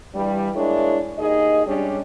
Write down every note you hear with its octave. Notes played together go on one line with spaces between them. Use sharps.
G2 E3 G3
G#3 A#3 D4 E4 C#5
D#2 D#4 G#4 D#5
G3 G#3 C#4 D4